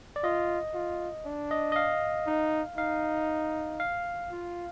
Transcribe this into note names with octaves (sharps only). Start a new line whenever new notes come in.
D5
F4 D#5
F4
D4
D#5
D#5
F5
D#4
D#4 F5
F5
F4